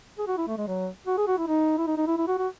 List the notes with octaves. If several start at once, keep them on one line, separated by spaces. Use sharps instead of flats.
G#4
F#4
E4
A3
G#3
F#3
F#4
G#4
F#4
E4
D#4
E4
D#4
D#4
E4
E4
F#4
F#4